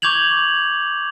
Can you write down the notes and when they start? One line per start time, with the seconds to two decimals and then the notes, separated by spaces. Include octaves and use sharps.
0.02 C#6 D6 G6 G#6 F7 F#7